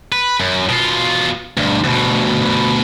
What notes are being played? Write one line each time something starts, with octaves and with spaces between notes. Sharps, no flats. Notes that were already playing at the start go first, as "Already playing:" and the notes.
B4
F#2
B2 F4
D2 G2
D2 B2